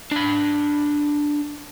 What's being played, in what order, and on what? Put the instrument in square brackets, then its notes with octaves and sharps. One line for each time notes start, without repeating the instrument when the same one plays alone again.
[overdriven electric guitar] D4 B5